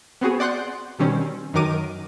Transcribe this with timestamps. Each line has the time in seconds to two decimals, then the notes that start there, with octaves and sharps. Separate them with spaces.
0.21 B3 C4 F#4 G#4
0.40 D5 F#5 C6 F#6 G6
0.99 B2 D#3 G3 C4 C#4
1.53 F#2 D#3 F#3 A#4 D6 D#7